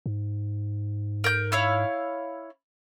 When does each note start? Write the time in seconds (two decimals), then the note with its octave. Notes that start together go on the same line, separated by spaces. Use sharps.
0.06 G#2
1.24 A#4 G6
1.52 E4 C#5 F5